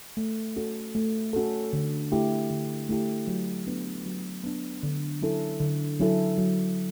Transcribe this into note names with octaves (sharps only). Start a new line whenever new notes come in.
A3
C#4 F#4 A4
A3
C#4 F#4 A4
D3
A3 E4 G4
D3
A3 E4 G4
F#3
B3 D4
F#3
B3 D4
D3
F#3 C#4 E4 A4
D3
F#3 C#4 E4 A4
F#3